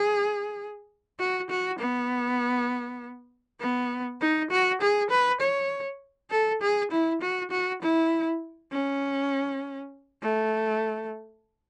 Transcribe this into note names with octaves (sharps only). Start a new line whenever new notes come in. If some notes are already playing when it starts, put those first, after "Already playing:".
Already playing: G#4
F#4
F#4
B3
B3
D#4
F#4
G#4
B4
C#5
A4
G#4
E4
F#4
F#4
E4
C#4
A3